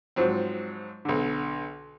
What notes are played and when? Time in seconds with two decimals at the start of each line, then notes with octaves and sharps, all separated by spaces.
0.16 G#2 F3 F#3 C4
1.05 B1 D3